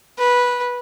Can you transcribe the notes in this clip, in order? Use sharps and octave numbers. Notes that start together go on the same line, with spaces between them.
B4